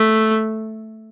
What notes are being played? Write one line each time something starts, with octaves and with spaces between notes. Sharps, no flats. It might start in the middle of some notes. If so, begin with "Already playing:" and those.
Already playing: A3